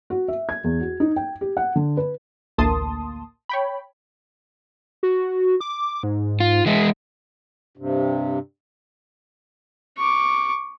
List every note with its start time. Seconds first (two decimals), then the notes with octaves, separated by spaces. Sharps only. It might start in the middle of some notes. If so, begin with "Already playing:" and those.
0.10 F#4
0.28 E5
0.49 G#6
0.64 E2
0.80 F#4
1.00 D#4
1.16 G5
1.41 G4
1.57 F#5
1.76 D3
1.97 B4
2.58 A1 D2 A#3 A5 C6 D#6
3.49 C#5 G5 B5
5.03 F#4
5.60 D6
6.03 G#2
6.40 F4
6.66 E3 G#3 E4
7.77 G2 C3
9.98 C#6 D6